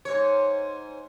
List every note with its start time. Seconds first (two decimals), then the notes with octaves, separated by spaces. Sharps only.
0.05 G#2 C#5